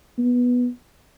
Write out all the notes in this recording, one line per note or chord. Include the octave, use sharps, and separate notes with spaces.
B3